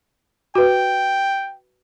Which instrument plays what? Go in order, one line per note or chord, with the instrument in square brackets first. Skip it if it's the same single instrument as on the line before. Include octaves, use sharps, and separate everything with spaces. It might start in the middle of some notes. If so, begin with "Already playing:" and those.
[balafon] F#4 B4 [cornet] G5